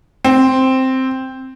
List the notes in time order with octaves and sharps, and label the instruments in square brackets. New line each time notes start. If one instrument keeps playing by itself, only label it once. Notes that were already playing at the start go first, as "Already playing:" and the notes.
[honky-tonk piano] C4